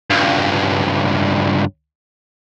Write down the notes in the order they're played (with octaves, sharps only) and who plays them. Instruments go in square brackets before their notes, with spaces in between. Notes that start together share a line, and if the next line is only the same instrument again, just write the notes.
[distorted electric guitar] C#2 G2